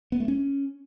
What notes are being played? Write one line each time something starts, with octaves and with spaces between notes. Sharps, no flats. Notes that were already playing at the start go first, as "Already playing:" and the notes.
B3
A3
C#4